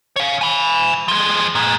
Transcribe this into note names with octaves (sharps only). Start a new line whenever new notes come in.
C#5 F5
G#5 B5
F3 G#3
A#2 G#3